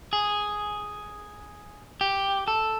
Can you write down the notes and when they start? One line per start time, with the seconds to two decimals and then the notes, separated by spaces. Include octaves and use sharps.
0.13 G#4
2.01 G4
2.48 A4